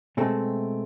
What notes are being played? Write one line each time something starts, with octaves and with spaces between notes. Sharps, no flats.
B2 G#3 A3 C4